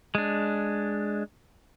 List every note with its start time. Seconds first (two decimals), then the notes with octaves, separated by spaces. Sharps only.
0.15 G#3 D4